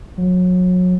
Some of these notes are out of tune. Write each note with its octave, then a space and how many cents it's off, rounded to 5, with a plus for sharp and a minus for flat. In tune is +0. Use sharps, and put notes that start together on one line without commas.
F#3 -30